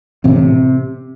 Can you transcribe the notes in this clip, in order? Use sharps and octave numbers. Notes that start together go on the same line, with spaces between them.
A1 A2 C3 C4